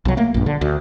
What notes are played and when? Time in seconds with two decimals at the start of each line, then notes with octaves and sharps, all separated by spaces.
0.05 B1 F#3
0.17 A3 A#3
0.34 A#1 G2
0.46 D3
0.61 D2